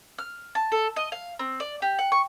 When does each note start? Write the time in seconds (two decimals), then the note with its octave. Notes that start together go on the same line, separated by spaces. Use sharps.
0.19 F6
0.55 A5
0.72 A4
0.96 D#5
1.12 F5
1.39 C4
1.60 D5
1.82 G4
1.99 F#5
2.12 C#6